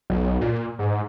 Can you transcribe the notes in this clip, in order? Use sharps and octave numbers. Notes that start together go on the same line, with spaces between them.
B1
A#2
G#2